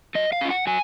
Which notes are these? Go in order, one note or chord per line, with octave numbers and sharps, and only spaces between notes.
F#3 D#5
F5
C#4 F4
F#5
F#3 G#5